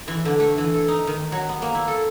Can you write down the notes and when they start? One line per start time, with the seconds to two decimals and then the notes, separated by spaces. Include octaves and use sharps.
0.08 E3
0.25 D3
0.40 A3
0.58 E3
0.74 A4
0.88 D#4
1.07 D#3
1.32 F#3
1.49 B3
1.62 A#3
1.75 E4
1.88 A4